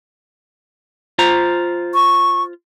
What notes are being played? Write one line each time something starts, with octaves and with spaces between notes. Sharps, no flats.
F4 C5 A#5
C#6